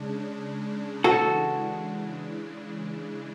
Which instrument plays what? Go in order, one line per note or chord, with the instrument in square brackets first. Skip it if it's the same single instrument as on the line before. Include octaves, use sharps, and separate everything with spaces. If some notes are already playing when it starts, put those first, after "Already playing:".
Already playing: [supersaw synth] C#3 G#3 D4
[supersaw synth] C#3 E3 G#3 D4 [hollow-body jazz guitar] F#4 A4